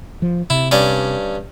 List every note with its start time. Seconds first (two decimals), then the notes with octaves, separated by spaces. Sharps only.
0.22 F3
0.50 C3 E4
0.71 G2 C#4 D5